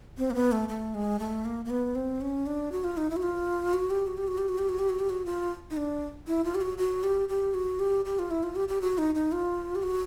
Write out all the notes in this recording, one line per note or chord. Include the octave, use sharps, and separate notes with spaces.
C4
A#3
B3
A3
A3
G#3
A3
A#3
A#3
B3
C4
C#4
D4
F#4
F4
D#4
E4
F#4
F4
F#4
G4
F#4
G4
F#4
G4
F#4
G4
F#4
G4
F#4
G4
F#4
F4
D#4
D4
E4
F4
G4
F#4
F#4
G4
G4
F#4
G4
G4
F4
E4
F4
G4
G4
F#4
D#4
D#4
F4
G4
F#4